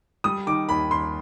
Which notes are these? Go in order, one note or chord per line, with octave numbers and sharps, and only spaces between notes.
G3 D#6
D#3 D6
D#2 B5
D#2 C6